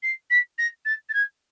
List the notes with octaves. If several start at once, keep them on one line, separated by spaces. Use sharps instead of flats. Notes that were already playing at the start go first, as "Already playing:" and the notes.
C7
B6
A#6
A6
A6
G#6